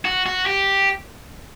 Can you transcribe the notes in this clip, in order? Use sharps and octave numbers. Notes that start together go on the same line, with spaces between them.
F#4
F#4
G4